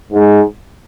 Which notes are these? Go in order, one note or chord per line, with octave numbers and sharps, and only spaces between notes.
G#2 G#3